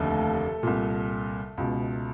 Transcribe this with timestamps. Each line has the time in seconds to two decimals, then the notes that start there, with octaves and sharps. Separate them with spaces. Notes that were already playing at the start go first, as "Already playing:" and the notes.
Already playing: F1 D#2 D3 A3 A4
0.63 C2 A#2
1.57 C#2 B2